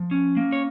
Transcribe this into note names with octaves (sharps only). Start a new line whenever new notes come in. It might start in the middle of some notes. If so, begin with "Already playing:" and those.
Already playing: F3
C#4
A#3
C#5